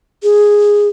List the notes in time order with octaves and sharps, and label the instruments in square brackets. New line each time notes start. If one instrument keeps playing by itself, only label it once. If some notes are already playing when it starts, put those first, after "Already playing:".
[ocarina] G#4